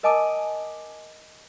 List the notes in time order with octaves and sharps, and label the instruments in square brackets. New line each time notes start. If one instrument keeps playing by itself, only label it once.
[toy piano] A#4 D#5 G#5 A5 D6 D#6